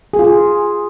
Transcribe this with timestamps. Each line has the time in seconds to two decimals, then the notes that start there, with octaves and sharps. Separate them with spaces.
0.14 G#4
0.19 F4
0.24 G#4